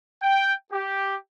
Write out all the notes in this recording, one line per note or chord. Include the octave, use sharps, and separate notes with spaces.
G5
G4